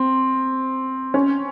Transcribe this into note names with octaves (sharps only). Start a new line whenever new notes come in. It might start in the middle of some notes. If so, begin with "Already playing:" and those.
Already playing: C4
C#4